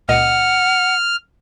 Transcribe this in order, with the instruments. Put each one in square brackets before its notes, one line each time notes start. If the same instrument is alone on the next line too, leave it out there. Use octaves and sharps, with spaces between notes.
[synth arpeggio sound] C#2 A#2 D#5 [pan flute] F#5 [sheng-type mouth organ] F6